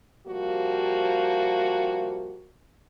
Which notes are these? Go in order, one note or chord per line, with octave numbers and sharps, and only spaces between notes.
C3 F3 G3 A#3 F#4